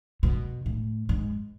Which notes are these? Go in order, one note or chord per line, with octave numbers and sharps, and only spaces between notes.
B2
A2
G#2